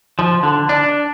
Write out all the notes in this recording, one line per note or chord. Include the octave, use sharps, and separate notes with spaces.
F3
D3
D4